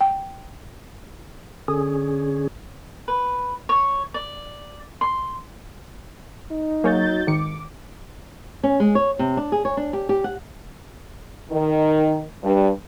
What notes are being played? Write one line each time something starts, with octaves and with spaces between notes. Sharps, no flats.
G5
D3 C#4 G#4
B4
C#5
D5
C6
D#4
F#3 A#3 G#4 C#5 G6 A6
G#1 D#3 D6 C#7
C#4
G#3
C#5
C3
D4
G#4
C#5
D4
G4
G4
F#5
D#3
G2